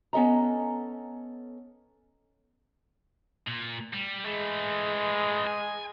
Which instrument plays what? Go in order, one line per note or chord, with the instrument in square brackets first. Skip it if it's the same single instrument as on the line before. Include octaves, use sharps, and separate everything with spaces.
[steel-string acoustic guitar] B3 C#4 A4 D#5 A#5
[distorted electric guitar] A#2
G3
[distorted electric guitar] E3 A3 [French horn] G#3
[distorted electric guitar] G#5